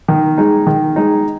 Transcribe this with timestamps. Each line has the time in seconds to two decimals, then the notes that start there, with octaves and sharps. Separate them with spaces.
0.08 D#3
0.38 G#3 D#4
0.67 D#3
0.96 G#3 D#4